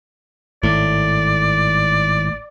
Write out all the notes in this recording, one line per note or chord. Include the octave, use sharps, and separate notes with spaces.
G#1 A2 D5